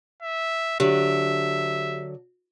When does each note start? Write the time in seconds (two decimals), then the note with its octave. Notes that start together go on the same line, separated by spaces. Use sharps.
0.22 E5
0.80 D3 F#3 G4 E5